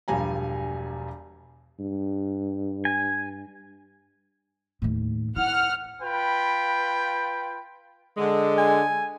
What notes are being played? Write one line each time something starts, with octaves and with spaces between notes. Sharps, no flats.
E1 G2 F3 G3 G#5 A#5
G2
G#5
D#2 A2
E4 F#5 F6
F4 B4 G5 B5
D3 G#3
G#5